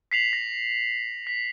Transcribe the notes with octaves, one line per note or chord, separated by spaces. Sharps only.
B6 C7 F7 F#7
A#6
B6